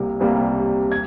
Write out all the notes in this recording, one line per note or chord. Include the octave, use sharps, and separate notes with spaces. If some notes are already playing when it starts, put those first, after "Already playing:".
Already playing: C2 C3 G3 A#3
C2 C3 G3 A#3
G#6